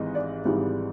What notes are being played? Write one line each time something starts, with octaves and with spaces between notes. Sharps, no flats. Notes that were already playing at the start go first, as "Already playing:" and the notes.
Already playing: G#1 G#2 E3 G3 D#5
D5
G#1 G#2 E3 G3